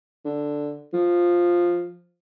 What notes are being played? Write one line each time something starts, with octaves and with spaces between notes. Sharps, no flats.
D3
F3